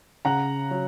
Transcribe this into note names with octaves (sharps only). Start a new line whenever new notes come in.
C#3 F#5 A#5
F#3